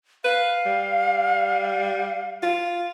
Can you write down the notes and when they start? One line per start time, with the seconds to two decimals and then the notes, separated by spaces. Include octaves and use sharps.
0.25 B4 F5
0.66 G3
2.43 F4